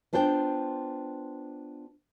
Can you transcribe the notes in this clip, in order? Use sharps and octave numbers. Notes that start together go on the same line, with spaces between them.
B3 D4 F4 C5 G5